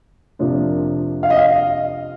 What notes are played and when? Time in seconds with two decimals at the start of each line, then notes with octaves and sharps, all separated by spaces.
0.39 F2 C3 F3 A#3 D4
1.23 F5
1.30 D#5
1.37 F5